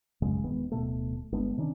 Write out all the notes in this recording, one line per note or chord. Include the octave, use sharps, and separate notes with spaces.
A1 F#2 C#3 G#3
E1 D#3 G#3 B3
D1 B2 A3
G1 G#3 B3 D4
C3 D#3 C#4 D4